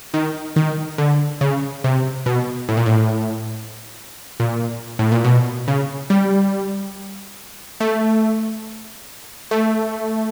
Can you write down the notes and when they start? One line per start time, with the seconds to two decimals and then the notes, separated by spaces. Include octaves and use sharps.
0.14 D#3
0.56 D#3
0.98 D3
1.41 C#3
1.84 C3
2.26 B2
2.69 A2
2.77 A#2
2.86 A2
4.40 A#2
4.99 A2
5.12 A#2
5.24 B2
5.68 C#3
6.10 G3
7.80 A3
9.51 A3